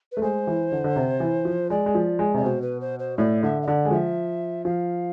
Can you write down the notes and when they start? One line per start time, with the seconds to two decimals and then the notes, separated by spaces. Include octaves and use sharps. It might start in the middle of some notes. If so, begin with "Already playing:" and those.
0.12 B4
0.17 A3
0.22 G#3 C5
0.47 E3
0.72 D3
0.84 D3
0.96 C3
1.20 E3
1.45 F3
1.70 G#3 D5
1.86 G#3
1.95 F3
2.19 G#3
2.34 C3 D5
2.43 B2 C5
2.62 B4
2.81 C5
2.99 C5
3.18 A2 D5
3.43 D3 E5
3.62 E5
3.67 D3 D5
3.85 G#3
3.91 F3 E5
4.65 F3 F5